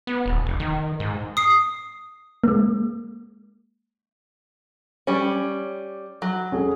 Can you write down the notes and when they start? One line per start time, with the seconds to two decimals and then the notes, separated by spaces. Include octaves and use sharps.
0.07 B3
0.26 D#1
0.46 F1
0.60 D#3
1.00 G#2
1.37 D#6 C7
2.44 G#3 A#3
5.07 G3 C#4
6.22 F#3
6.52 C#4 G#4 A4